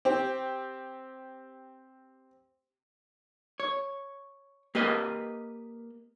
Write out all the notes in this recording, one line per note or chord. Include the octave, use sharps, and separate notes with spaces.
C4 G4
C#5
A#3 G4 B4 D#5